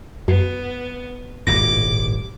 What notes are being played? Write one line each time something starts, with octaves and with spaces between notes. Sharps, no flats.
F#2 B3
D#1 G#1 A2 D6 A#6